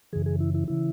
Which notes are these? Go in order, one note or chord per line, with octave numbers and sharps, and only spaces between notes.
F#2 C#3 E3 G#4
G#4
E4
E4
C#3 E3 E4